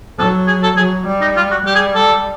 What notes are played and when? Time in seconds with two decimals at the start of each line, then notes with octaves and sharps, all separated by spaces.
0.18 F#3 A4
0.47 G#4
0.63 A4
0.77 F#3 G#4
1.07 G3
1.21 D#4
1.37 F4
1.51 F#4
1.66 G3 G4
1.75 G#4
1.95 A4